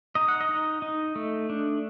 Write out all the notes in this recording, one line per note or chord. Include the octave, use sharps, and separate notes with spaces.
D#4 D#5
F#5
D#5
D#4
D#4
A3
D4